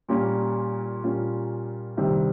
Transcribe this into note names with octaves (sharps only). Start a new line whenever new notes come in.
A#2 G3 A#3 C#4 F4
A#2 G3 A#3 C#4 F4
C2 C3 D#3 G3 C4